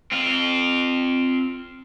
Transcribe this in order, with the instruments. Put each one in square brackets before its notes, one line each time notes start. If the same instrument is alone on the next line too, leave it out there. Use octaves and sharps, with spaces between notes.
[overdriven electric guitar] C4 F4